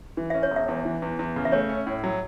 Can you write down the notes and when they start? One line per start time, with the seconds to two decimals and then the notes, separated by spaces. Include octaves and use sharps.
0.17 E3
0.30 C#4 E5
0.43 C#5
0.51 E1
0.56 E5
0.68 E2
0.85 E3
1.02 E2
1.19 E2
1.36 C#3
1.45 E5
1.52 A3 C#5
1.69 C#4
1.87 A2
2.04 F#3